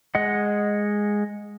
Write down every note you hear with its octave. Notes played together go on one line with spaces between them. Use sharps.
G#3 D#5 F#5